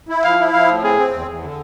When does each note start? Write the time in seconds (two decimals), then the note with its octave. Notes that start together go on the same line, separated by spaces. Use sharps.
0.09 E4
0.24 F3 F5
0.39 E4
0.53 F3 F5
0.68 A2
0.82 C4 G#4
0.98 C4
1.13 E2
1.27 E2
1.43 D3